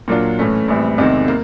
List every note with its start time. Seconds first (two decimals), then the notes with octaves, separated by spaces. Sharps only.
0.08 A#2 F#3 A#3 D4 F4
0.39 A2 E3 A3 C#4
0.68 A#1 A2 E3 G3 C4
0.98 E2 C3 D#3 G#3 C4
1.28 A#3